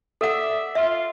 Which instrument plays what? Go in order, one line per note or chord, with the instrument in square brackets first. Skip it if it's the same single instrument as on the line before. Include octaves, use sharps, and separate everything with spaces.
[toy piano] A4 F#5 [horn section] D5 E5
[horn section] F4 [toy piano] E5